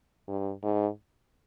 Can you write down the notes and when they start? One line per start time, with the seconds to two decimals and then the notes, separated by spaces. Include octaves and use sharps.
0.28 G2
0.63 G#2